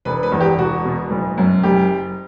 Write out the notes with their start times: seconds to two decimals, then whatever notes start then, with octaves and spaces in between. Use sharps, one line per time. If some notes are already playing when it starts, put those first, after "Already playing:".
0.05 E1 B4
0.23 B4
0.32 E2
0.40 G4
0.58 E1 F#4
0.85 B2
1.11 F#1
1.37 F#2
1.63 F#1 G4